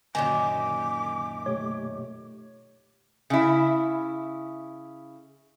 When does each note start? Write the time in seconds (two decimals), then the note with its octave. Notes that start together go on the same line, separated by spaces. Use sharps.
0.15 F#2 A#2 D3 D#3 G#5 D6
1.46 B2 A3 G4 C#5
3.30 C#3 E4